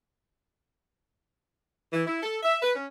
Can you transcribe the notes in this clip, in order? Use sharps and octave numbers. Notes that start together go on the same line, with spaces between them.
E3
E4
A4
E5
B4
C#4